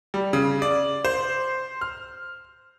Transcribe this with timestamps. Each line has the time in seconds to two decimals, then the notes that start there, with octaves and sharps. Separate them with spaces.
0.14 G3
0.33 C#3
0.62 D5
1.05 C5
1.81 F6